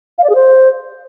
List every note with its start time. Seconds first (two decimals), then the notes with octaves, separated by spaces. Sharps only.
0.18 F5
0.24 D5
0.29 G#4
0.35 C5